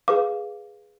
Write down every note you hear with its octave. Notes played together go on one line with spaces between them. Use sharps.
G#4 B4 F5 D6